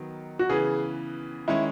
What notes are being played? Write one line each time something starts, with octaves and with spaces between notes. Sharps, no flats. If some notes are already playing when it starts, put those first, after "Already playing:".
Already playing: D#3 F#3 B3
F#4
C#3 E3 B3 G#4
D#3 G#3 C#4 E4